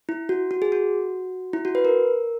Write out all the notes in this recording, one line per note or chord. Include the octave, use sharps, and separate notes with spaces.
E4
F#4
F#4
G#4
F#4
E4
F#4
B4
A#4